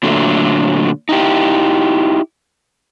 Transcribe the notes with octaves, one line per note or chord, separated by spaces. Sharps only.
A#2 D3 F#3 A3
D#4 E4 G4